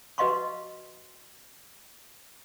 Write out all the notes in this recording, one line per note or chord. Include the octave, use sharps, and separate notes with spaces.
F#4 B4 D#5 F5 C6 C#6